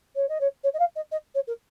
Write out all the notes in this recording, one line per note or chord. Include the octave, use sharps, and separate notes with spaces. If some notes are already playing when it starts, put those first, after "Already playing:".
C#5
D#5
C#5
C#5
D#5
F5
D#5
D#5
C#5
A#4